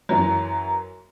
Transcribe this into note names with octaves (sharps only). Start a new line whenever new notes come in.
F#2 E3 F#3